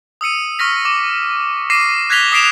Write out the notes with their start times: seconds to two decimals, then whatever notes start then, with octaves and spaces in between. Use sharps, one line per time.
0.21 D#6 E6 C#7 D#7
0.59 C#6 F6 A#6 B6
0.85 D6
1.70 C#6 D6 A#6 C7 D#7
2.10 F#6 G#6 A#6 B6 F7 G7
2.32 D#6 B6 C7 D7 E7 F7